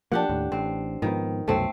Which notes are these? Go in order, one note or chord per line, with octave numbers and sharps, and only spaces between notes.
F3 A#3 D4 G4 F#5
D#2 A2
A1 C4
G#2 D#3 F3 B3
C2 F#2 B2 A3 C4